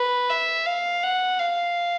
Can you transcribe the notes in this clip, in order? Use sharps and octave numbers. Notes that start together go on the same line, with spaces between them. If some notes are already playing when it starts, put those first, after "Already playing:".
Already playing: B4
E5
F5
F#5
F5